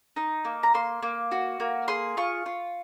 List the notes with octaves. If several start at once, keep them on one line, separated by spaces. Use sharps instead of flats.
D#4
A#3
A#5
A#3 C6
A#3
F#4
A#3
G#4 C6
F4 C#6
F4